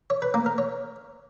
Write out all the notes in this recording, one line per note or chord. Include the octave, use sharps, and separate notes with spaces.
C#5
B4
A#3
A#4
C#5